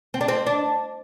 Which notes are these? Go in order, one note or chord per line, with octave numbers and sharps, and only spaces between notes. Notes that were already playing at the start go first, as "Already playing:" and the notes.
C4
D4
C4
D4